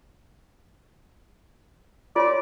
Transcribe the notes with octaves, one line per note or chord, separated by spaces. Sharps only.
F4 C#5 D5 C6